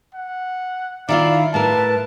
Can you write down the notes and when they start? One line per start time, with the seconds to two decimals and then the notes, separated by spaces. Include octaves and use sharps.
0.14 F#5
1.09 D#3 E4 F4 D5 F5
1.54 A2 A#4 B4 A5